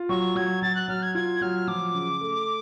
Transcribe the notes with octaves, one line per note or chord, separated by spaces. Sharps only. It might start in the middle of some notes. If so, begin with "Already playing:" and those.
Already playing: F4
F#3 C#6
F#3 G#6
F#3 A6
F#6
F#3 F6
G#6
F4 G#6
F#3 F6
F3 D6
C#3
A3